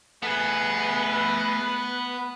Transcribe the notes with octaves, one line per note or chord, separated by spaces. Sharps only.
A3 B3 G#4 B4